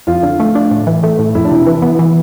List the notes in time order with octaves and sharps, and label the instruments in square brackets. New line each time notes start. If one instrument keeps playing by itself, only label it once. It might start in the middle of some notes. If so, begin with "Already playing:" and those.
[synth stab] F2 [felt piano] F4
[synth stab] D3
A3
D4
A2
E3
A3
A2
[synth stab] F2 [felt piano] E4
[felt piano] D4
[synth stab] C3 [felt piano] E4
[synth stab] E3
B3
E3